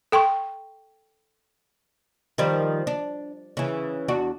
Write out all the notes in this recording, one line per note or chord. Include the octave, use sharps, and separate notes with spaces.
A4 G5 C6 C#6
D#3 F3 G3
D4
C#3 E3
E2 D4 F#4